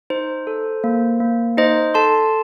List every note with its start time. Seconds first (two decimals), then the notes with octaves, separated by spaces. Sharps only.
0.10 D#4 C5
0.47 A4
0.84 A#3
1.20 A#3
1.57 D#4 C5 D#5
1.94 A4 A5 C6